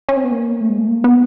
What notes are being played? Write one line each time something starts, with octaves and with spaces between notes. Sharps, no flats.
C#4
C4
B3
A#3
A3
G#3
A3
A#3
B3